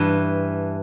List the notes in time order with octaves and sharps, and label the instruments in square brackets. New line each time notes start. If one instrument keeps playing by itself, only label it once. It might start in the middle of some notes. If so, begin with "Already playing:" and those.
Already playing: [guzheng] G2 E3